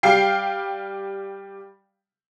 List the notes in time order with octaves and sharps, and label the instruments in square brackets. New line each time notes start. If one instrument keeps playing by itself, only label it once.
[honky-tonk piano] G3 F5 G5 C7